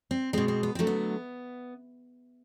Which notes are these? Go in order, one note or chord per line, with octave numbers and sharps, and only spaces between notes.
C4
B2 G#3 C4
C4
B3
D3 F#3 A3 C4
B3